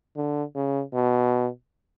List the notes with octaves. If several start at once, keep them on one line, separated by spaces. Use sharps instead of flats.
D3
C#3
B2